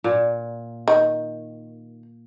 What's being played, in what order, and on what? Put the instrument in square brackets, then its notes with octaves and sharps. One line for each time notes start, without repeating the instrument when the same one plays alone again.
[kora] A#2
[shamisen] D#3